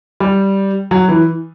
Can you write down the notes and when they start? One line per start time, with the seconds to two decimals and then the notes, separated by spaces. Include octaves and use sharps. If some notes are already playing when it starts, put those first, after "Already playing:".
0.20 G3
0.91 F#3
1.09 E3